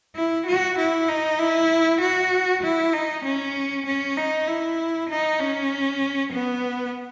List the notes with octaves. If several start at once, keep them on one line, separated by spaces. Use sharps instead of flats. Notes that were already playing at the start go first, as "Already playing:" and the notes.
E4
F#4
E4
D#4
E4
F#4
E4
D#4
C#4
C#4
D#4
E4
D#4
C#4
B3